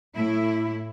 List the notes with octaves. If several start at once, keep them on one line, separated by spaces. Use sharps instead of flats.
A2 E4